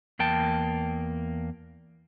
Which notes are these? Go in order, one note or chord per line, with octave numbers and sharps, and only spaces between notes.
E2 A#3 G5 A5